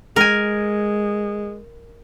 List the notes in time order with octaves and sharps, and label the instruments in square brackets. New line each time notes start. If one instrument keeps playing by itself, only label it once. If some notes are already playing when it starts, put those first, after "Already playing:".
[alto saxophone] G#3 [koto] A#4 G#5